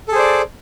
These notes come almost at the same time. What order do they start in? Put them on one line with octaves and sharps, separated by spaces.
A4 G#4 C5 D5